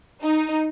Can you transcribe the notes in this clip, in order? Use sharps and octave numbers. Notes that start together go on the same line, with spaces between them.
D#4